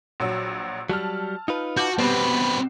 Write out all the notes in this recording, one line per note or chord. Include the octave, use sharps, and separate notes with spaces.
A#1 F#3 E6
F#3 G3 A5 F6
D#4 F4 B4
F#4 A5 D6 G6
B2 G3 B3 C4 B4